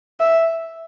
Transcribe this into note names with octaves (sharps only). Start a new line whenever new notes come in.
E5